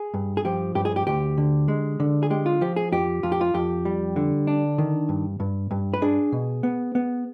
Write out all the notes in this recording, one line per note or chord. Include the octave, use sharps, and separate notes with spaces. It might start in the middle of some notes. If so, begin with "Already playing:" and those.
Already playing: G#4
G2
G#4
F3 G4
G2 G4
G#4
G4
D2 G4
D3
G#3
D3
G#4
G#3 G4
F4
F3 G4
G#4
F2 G4
F2 F4
G4
F4
F2 G4
G3
D3
D4
D#3
G2
G2
G2
B4
D4 G#4
B2
B3
B3